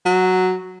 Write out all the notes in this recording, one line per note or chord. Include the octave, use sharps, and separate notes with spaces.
F#3